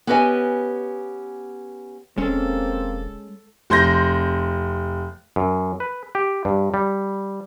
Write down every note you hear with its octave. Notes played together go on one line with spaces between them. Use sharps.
B3 C#4 G4 B4 D#5 G#5
E1 G#3 A#3 C4 C#4 A4
F1 C6 G6 A#6
F#2
B4
G4
G2
G3